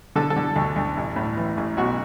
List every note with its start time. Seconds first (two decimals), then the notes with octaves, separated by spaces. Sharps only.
0.16 D3 A4
0.30 A4
0.36 D3
0.56 D2
0.76 D2
0.97 A1
1.16 A2
1.37 E3
1.57 A1
1.77 B1 F#4